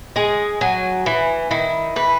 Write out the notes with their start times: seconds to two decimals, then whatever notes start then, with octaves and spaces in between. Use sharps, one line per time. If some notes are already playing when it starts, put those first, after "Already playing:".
0.16 G#3 G#4
0.61 F#3 G#5
1.06 E3 E4
1.51 D#3 E4
1.96 E3 B4